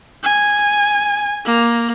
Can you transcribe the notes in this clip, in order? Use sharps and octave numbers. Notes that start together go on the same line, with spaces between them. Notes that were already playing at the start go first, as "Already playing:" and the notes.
G#5
A#3